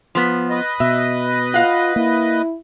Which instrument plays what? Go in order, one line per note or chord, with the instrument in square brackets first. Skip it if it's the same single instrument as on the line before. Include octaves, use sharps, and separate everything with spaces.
[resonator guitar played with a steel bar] F3 B3
[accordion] B4 D#5
[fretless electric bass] B2 [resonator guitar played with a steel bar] E5
[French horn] F4 [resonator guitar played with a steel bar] F5 F#5
[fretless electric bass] A#3 [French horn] E4